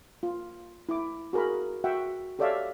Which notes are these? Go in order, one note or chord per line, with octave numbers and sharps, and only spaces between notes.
F4
E4 D6
F#4 G#4 A#4 A#5 B5
F#4 E5 F#5 G5
G4 A4 C#5 D5 E5 F5